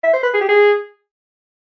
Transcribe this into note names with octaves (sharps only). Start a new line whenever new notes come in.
E5
C5
B4
G#4
G4
G#4